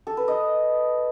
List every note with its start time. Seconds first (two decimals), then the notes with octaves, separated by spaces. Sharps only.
0.07 A4
0.17 B4
0.28 D#5